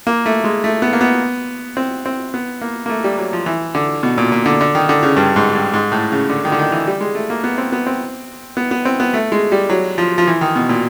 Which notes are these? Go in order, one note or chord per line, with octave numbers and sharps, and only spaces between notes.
A#3
A3
G#3
A3
B3
A#3
B3
C4
C4
B3
A#3
A#3
A3
G3
F#3
F3
E3
D3
B2
A#2
A#2
D3
D3
D#3
D3
C#3
G2
G#2
G2
G#2
A2
C#3
D3
D#3
D3
D#3
E3
G3
G#3
A3
A#3
B3
C4
B3
C4
B3
B3
C4
B3
A3
G#3
G3
F#3
F3
F3
E3
D#3
B2
A#2